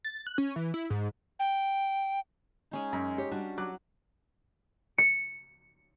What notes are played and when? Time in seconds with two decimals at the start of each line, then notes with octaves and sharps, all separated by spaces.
0.05 A6
0.27 F#6
0.38 C#4
0.56 E3
0.74 E4
0.90 G#2
1.39 G5
2.71 G#3 C#4 D#4
2.93 F#2
3.18 G4 C#5
3.32 G3 D4 F#4
3.58 F#3 D6 F#6
4.98 C#7